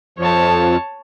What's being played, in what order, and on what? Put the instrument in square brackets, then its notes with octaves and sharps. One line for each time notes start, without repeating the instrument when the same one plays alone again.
[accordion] F2 F3 [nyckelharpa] C#5 A5